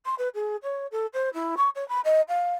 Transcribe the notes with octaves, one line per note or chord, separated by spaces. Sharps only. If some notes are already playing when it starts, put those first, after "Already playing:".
C6
B4
G#4
C#5
A4
C5
E4
C#6
C#5
B5
D#5
F5